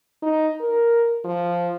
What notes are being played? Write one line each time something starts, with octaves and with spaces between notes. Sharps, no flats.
D#4
A#4
F3